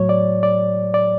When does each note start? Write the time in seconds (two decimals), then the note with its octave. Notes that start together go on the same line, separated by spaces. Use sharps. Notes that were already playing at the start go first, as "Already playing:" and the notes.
Already playing: A2 F#3 C#5
0.09 D5
0.43 D5
0.94 D5